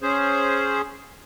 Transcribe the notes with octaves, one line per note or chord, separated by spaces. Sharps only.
C#4 G#4 C5